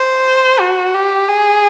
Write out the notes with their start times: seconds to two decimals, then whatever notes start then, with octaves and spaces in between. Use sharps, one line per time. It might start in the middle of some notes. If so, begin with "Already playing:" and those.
Already playing: C5
0.60 F#4
0.95 G4
1.29 G#4